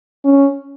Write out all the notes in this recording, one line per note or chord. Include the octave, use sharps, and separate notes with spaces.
C#4